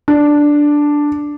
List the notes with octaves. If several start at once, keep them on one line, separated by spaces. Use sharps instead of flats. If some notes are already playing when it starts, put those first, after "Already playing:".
D4